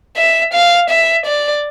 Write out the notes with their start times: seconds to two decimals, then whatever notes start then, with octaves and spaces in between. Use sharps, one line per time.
0.17 E5
0.53 F5
0.90 E5
1.26 D5